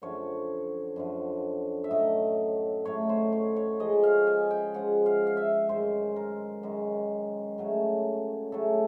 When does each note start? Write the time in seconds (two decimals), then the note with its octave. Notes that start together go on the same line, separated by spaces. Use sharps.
0.02 F#2 D3 F3 C#5
0.96 F#2 D3 F3
1.84 E5
1.91 A2 F#3 A3 D#5
2.85 A2 F#3 A3 C#5
3.09 C5
3.32 C#5
3.56 C#5
3.80 C#3 F3 G#3 D#5
4.03 F5
4.27 G#5
4.51 G5
4.74 C#3 F3 G#3 F#5
5.06 F5
5.27 F5
5.37 E5
5.69 F#2 D#3 G#3 C5
6.16 A#4
6.63 F#2 D#3 G#3
7.58 C#3 F#3 A3
8.52 C#3 F#3 A3 A4